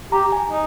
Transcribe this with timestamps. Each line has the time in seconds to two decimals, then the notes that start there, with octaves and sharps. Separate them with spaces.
0.12 G4 A#5
0.32 G#5
0.51 D#4